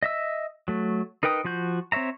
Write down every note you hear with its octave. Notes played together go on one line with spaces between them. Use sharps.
D#5 E5 E6
F#3 A3
D#4 A#4 B4 G5 D#6
F3 F4 F#4 G6
C4 C5 C#5 E5 A#5